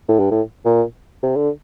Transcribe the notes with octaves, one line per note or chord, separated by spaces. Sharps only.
A2
G2
A2
A#2
C3
D3